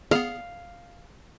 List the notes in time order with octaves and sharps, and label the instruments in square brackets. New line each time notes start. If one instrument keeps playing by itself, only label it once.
[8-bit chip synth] B3 G#4 [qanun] F5